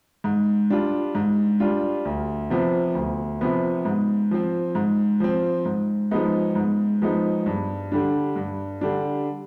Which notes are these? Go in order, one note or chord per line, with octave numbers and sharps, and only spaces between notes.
G#2
G3 D4 F4
G#2
G3 D4 F4
D2
C3 F3 B3
D2
C3 F3 B3
G#2
F3 C4
G#2
F3 C4
G#2
F3 G#3 B3 D#4
G#2
F3 G#3 B3 D#4
G2
D3 G3 D4
G2
D3 G3 D4